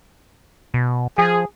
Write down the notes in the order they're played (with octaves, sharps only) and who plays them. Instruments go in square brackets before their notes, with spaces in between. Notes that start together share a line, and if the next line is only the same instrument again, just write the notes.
[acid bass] B2
[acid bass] F3 [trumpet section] G#4